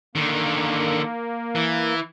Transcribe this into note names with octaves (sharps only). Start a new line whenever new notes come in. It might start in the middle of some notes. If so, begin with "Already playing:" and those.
D3 D#3 A#3
E3